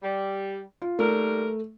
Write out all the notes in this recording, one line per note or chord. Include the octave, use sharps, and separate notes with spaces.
G3
F4
D#2 G3 A3 A#4